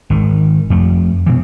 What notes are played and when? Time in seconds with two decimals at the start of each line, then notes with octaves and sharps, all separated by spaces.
0.10 G#1 D#3
0.70 F2 A3
1.26 B2 E3